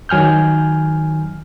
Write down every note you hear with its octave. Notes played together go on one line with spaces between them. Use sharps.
D#3 F#3 G#5 F6 G6